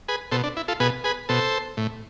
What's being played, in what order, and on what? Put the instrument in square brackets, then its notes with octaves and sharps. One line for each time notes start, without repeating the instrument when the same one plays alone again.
[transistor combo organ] G#4 B4
B2 A4 C5
D4
E4
F4 A4
B2 G#4 B4
G#4 B4
B2 A4 C5
A2